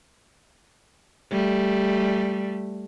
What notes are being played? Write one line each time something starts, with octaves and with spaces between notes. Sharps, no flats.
G3 A3